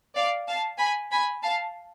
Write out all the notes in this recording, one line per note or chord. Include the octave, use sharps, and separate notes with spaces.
D5 F5
F5 A5
G#5 B5
G#5 B5
F5 A5